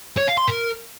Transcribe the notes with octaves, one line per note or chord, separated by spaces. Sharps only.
C#5
F5
C6
A#4